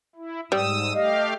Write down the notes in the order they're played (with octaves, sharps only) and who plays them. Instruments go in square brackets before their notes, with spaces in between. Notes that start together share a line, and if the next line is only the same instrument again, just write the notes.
[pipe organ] E4
[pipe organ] G#2 D#6 E6 [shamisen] G3
[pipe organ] A3 G4 F5 [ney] D#5